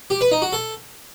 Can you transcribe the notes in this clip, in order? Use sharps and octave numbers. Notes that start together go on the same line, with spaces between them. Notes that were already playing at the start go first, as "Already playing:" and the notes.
G4
B4
D#4
F#4
A4